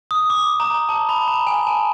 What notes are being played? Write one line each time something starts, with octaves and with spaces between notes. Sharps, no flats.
D#6
D6
A#5
A5
B5
A#5
G#5
A5